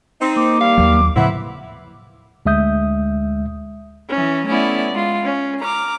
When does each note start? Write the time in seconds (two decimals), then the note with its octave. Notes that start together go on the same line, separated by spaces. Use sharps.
0.21 C4 D#4
0.36 A#3 D6
0.60 G3 F5
0.78 D#2 F#3
1.16 A2 C#3 F3 B3 C4 E4 F#5
2.46 D2 G#3 E5 D#6 G6
4.11 E3 C#4
4.46 A3 B3 C#4 E4 D5
4.92 G#3 F4
5.24 C#4
5.60 A#5 D6 F6